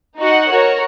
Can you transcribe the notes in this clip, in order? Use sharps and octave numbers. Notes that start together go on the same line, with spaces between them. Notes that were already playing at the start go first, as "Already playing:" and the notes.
D#4 F#4 D#5 F#5
F#4 A#4 C#5